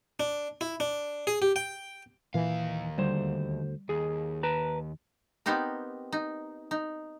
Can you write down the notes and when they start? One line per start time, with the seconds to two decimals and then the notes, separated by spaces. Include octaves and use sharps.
0.20 D4
0.61 E4
0.80 D4
1.27 G#4
1.42 G4
1.56 G5
2.34 D#2 A#2 E3 F5
2.98 D2 G3 C5
3.89 D#2 G#4
4.43 B4 A5 A#5
5.46 B3 C4 D#4 G4 A#4
6.12 D#4
6.71 D#4